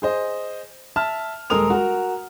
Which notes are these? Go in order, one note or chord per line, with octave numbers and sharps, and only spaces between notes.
G#4 C5 D#5
E5 A5 F6
D#1 G#3 A4 A#4 D#6 F7
F#4 A#4